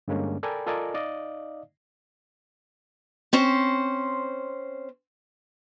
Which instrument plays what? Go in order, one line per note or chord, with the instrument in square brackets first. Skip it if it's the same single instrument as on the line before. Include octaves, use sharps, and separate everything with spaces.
[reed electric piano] G2 D3 G#3 A#3 C#4
A4 A#4 D5 G5 G#5 B5
F4 A4 A#4 D5 D#5 G#5
D#4 D5 D#5 F5
[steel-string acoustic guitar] C4 C#4 C5